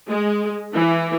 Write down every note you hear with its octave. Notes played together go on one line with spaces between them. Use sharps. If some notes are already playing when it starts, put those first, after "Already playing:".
G#3
E3